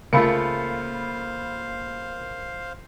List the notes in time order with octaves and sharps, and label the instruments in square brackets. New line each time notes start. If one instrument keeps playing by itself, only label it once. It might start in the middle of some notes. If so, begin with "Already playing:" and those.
[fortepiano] C#2 A3 F4 [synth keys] A#3 [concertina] C5 F5 [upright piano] B5 C#7